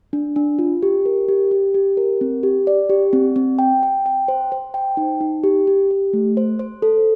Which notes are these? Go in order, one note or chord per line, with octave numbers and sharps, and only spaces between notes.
D4
D4
F4
G4
A#4
G4
G4
G4
A#4
C4
G4
D5
G4
C4
C4
G5
G5
G5
C5
C5
G5
D#4
D#4
G4
G4
G4
A3
C5
C5
A4